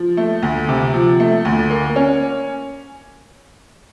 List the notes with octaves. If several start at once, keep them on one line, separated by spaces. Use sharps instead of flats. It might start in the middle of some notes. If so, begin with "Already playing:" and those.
Already playing: F3
A3
D2
C3
F3
A3
D2
A#3
C#4